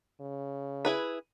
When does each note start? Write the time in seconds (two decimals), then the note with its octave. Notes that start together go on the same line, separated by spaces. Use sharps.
0.21 C#3
0.85 E4 G#4 B4